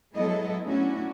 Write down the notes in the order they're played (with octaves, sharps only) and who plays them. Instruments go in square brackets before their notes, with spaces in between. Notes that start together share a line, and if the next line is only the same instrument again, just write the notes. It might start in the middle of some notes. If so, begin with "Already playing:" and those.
[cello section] F#3 G#3 B3 E4 A4 D#5
F#3 A3 C#4 D4 E4 F#4